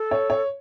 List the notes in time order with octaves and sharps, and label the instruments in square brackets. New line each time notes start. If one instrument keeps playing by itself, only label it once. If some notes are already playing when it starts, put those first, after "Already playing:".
Already playing: [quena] A4
[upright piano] C#5
C#5